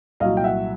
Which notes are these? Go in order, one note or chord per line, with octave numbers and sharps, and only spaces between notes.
C2 A#2 F#3 D#5 F5
G5
E5 F#5